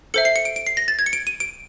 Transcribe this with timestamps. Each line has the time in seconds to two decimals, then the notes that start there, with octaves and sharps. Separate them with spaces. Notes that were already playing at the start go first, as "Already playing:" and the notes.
0.14 A4 C5 E5 C#7
0.25 C7
0.36 C#7
0.45 D7
0.56 D7
0.67 C7
0.77 A#6
0.88 A6
0.99 G#6
1.06 C#7
1.13 D7
1.27 D#7
1.40 D7